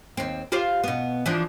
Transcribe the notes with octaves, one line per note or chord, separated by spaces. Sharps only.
D#2 C4
F4 G4 C5
B2 B3
E3 F3 D4